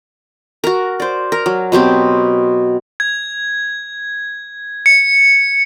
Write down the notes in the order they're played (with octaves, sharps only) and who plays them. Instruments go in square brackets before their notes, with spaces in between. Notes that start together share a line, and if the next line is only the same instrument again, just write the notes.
[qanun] F#4 A#4
C5 D5
A#4
F#3
B2 F#3 C4 G4
[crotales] G#6
C#7